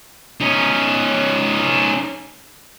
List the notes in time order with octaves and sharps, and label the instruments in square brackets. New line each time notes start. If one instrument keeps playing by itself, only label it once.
[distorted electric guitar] C#4 D#4